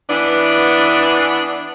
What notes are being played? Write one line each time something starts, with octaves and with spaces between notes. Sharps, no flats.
E3 B3 D4